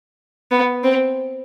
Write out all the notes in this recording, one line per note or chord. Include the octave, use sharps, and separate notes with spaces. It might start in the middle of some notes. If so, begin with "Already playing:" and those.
B3
C4